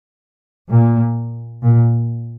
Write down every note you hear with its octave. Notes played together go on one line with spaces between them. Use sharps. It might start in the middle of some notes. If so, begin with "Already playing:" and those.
A#2
A#2